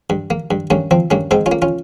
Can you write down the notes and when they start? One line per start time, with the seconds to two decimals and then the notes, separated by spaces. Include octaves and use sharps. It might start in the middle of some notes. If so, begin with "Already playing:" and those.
0.10 G2
0.30 A#3
0.51 G2
0.70 G2 A#3 C#4
0.91 F3 C4
1.11 G2 A#3 C#4
1.31 G#2 C4 D#4
1.46 C#4 F4
1.52 A#3
1.62 C#4 F4